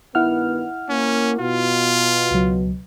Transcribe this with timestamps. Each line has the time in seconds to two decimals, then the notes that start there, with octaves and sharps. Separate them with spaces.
0.15 G2 D#3 B3 E4 F#5 F6
0.89 A#3 C#4
1.39 B2 F4
2.31 C#2 F#3